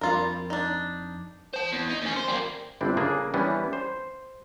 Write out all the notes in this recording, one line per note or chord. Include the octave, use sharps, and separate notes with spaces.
F2 G3 F4 A#4
D4 D#4
C5 A5
E2
D#4
D#2 C#4
C5
G3 A#3
G1 C4 D4 E4
C#3 A#3 D4 G#4
E3 G3 B3 C#4 D4
C5